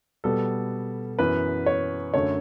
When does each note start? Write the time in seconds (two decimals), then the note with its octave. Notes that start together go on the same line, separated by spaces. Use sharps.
0.24 B2 G3 B3 A4
1.19 F#2 E3 B3 B4
1.66 C#5
2.14 F#2 D3 A3 C#5